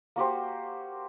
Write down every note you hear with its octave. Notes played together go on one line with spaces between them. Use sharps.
A#3 F#4 G4 C5